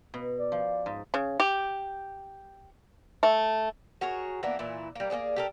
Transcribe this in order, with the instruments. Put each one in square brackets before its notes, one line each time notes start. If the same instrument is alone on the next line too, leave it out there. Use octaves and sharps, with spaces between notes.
[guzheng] B2
[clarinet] D5
[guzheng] F3
G#2
[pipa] C#3
G4
A3
[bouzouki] F#4 G#4 A#4 C#5
E3 A#3 B3 D4
A#2 E3 E4
G3 A#3
A#3 B3 G#4 D5
G4 A4 A#4